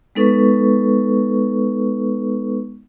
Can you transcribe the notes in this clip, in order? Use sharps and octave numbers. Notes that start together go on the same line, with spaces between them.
G#3 B3 D#4 A4 B4 C#6